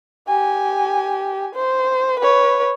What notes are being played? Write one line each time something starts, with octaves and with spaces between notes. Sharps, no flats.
G4 G#5
C5
B4 C#5